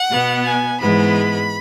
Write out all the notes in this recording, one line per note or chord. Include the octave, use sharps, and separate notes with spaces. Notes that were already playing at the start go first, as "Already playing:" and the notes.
Already playing: F#5
B2 B3
G#5
G#2 E3 G#3 B3 B5